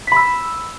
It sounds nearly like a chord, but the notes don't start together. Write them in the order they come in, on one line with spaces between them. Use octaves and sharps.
B6 B5 E6